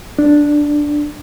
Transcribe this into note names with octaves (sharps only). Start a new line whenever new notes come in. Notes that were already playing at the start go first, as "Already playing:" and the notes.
D4